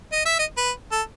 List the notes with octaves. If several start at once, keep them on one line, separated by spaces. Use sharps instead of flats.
D#5
E5
D#5
B4
A4